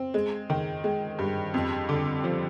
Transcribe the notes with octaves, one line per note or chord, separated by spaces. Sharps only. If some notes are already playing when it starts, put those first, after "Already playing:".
Already playing: C4
G#3
D#3
G#3
G2
F2
D3
F3